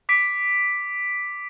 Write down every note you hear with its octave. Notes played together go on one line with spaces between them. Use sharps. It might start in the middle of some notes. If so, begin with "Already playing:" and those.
D6 B6 D7